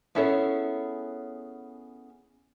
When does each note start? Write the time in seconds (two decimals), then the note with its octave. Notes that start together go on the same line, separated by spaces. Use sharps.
0.15 B3 C#4 E4 G#4 A4 C#5